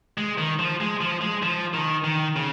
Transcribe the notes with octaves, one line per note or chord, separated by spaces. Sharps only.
G#3
D#3
F3
G#3
F3
G#3
F3
D#3
D#3
C#3